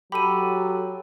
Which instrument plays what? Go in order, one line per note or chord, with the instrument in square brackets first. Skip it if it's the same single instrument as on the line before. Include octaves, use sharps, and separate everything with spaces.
[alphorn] F#3 [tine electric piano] G4 A4 [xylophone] B5 D#7